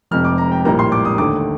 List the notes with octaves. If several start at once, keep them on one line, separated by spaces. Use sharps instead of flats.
F1 F2 C3 F6
D6
A#5
G5
A#1 A2 G3 A#3 A#5
C6
D6
D#6
D#2 D3 A3 D6